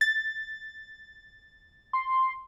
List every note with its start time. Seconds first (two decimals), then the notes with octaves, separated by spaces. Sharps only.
0.01 A6
1.93 C6